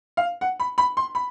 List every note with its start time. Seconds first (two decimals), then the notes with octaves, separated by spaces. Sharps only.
0.17 F5
0.41 F#5
0.60 B5
0.78 B5
0.97 C6
1.15 B5